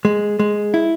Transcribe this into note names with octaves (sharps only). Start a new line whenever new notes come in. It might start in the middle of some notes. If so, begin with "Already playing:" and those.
G#3
G#3
E4